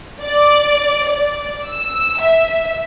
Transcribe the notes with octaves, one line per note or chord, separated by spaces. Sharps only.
D5
D5
E6
E5